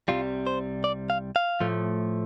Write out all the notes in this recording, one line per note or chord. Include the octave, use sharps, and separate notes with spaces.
C2 C3 G3 F4
C5
D5
F5
F5
A2 F3 A3